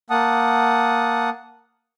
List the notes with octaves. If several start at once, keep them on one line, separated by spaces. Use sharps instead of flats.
A#3 F#5 A5 D#6